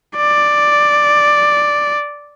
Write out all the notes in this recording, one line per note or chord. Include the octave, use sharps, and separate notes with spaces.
D5